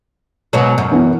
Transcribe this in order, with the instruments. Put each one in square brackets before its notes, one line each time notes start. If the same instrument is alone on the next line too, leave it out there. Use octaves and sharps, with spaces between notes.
[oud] G#2 B2 F#3
F#2
[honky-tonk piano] E3 B3